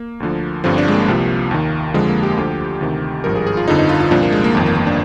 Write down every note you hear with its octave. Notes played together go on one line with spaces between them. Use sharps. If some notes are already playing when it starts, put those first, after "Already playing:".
Already playing: A#3
D2 D3 F3
G1 G2 D3 F3 C4
D4
G#3
A#3
C2 C3 F3
D#2 D#3
F2 D3 F3 G#3
A#3
G4
D2 D3 F3
D2 C3 D#3
G#1 G2 F3 A#4
G#4
G#4
F4
G1 F2 D3 F3 D#4
D#4
F4
F4
C2 A#2 F3 D4
A#3
G#3
A#3
G1 F2 D#3
A#3
A#3
D4